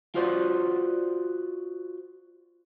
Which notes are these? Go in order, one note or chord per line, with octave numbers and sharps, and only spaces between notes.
F4 F#4 C5 D5